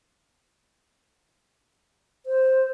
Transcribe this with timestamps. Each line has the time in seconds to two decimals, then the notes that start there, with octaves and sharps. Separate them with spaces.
2.26 C5